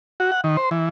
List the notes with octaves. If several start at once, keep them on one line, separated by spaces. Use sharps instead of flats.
F#4
F#5
D#3
C5
E3